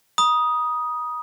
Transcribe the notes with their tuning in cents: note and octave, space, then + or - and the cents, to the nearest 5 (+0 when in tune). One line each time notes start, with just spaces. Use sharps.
B5 -45 D#6 +0